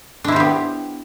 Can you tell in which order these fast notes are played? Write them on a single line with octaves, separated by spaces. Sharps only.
D4 E4 C5 G4 B3